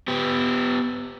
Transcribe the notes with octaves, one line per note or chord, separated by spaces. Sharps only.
B3 G4